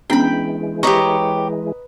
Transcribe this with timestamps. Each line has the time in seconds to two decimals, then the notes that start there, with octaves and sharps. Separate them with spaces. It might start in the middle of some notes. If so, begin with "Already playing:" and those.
0.10 E3 G#3 B3 C#4 D4 G5 B5
0.83 G4 B4 C#5 D#5 A#5 C#6